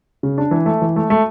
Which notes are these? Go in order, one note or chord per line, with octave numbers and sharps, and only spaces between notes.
C#3
D4
E3
A3
E3
A3
A3